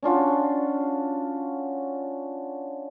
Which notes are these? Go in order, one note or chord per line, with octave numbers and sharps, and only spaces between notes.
C#4 D4 F4 F#4